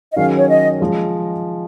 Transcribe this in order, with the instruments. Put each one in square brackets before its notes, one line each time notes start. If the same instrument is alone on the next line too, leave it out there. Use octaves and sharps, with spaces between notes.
[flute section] D#5
[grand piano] D#3 F#3 C#4 G#4 [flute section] F5
[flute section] C#5
D#5
[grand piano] F3 G#3